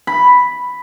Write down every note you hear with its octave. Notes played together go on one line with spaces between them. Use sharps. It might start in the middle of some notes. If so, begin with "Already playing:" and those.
B5